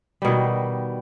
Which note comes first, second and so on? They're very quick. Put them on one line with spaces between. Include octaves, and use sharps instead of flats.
G3 B2 D#3